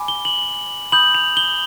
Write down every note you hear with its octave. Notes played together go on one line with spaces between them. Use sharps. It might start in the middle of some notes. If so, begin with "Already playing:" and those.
Already playing: G#5 B5 D6
G7
F#7
B5 D#6 G6 F#7
F7
G7